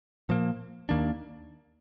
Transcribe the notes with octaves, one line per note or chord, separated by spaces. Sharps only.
A#2 F3 A#3
D#2 D#3 A#3 D4